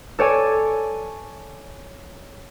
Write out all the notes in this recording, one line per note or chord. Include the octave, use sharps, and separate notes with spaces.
A4 C#5 D5 G#5